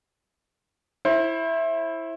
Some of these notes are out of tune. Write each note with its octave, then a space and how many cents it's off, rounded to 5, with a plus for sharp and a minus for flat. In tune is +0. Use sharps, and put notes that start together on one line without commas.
E4 +0 C5 +35